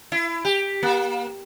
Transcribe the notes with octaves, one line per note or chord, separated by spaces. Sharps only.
E4
G4
A#3